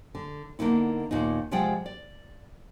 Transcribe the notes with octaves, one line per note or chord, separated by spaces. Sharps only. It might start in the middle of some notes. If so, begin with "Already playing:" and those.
D3
D3 A#3 B3 D#4 E4
D#2 A#2 B3 D#4
C3 F3 G#3 D5 F#5 G5
D5